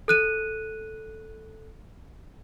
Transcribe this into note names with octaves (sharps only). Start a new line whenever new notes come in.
A4 F#6 D#7